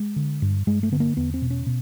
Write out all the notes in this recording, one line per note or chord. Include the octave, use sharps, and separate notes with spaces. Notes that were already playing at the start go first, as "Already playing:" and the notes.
Already playing: G#3
D3
G2
G2 G#3
A3
D3 B3
A#3
E2 B3
C4
B2
C#4
B2